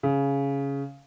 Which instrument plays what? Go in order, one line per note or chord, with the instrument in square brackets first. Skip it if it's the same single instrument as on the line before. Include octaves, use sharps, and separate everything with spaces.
[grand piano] C#3